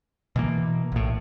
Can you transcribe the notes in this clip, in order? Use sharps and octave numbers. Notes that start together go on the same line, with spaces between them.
B2 E3 A#3
A#1 A2